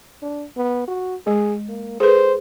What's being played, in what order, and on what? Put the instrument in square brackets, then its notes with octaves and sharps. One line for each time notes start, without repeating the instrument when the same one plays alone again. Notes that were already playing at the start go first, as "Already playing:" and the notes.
[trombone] D4
B3
F#4
[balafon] G#3 [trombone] G#4
[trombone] A#3
[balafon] G#4 A4 B4 [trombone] C5